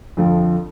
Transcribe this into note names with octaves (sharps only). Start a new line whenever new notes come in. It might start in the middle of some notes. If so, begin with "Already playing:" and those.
F2 D3 F3